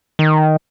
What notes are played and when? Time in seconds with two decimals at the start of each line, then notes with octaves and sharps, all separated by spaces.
0.19 D#3